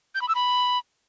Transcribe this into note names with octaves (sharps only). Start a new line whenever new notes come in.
G6
B5
E6
B5